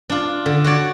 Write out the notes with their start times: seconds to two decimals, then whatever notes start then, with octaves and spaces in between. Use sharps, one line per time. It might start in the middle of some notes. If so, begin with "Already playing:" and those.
0.10 D4 F4
0.46 D3
0.64 F#4 C#5 D5